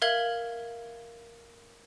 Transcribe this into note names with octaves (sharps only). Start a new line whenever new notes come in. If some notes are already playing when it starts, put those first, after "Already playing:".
A#4 E5 F5 G#6 F#7